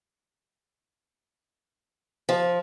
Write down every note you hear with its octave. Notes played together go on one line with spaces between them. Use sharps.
F3